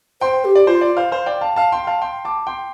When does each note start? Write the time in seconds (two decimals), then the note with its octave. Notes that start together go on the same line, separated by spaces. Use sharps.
0.21 C5 G5 C6
0.45 G4
0.55 D5
0.67 F4 C5
0.81 D5
0.97 C5 F5
1.12 C5 F5
1.26 D5 G5
1.41 F5 A5
1.56 F5 A5
1.72 G5 C6
1.87 F5 A5
2.02 G5 C6
2.25 A5 D6
2.47 G5 C6